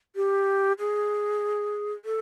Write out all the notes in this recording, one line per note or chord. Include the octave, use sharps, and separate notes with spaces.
G4
G#4
A4